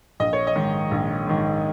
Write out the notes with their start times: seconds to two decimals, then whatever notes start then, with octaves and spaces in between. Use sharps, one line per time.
0.20 A#1 D#5
0.33 C#5
0.47 D#5
0.55 G#2 D#3
0.91 A#1
1.27 G#2 D#3